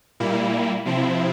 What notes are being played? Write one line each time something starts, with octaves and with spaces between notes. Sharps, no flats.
A#2 G3 A#3 E4
C3 F3 C4 E4